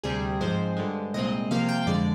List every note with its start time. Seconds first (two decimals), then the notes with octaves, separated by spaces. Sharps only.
0.04 D2 C3 G3 C4 G#4
0.40 G#2 F3 G#3 C4 C5
0.77 G2 D3 G#3
1.14 C2 A#2 G#3 C4 D#5
1.51 C2 C3 F3 A#3 F5
1.69 G5
1.87 F2 D3 G#3 D5